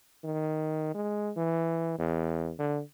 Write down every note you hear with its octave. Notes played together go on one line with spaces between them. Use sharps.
D#3
G#3
E3
E2
D3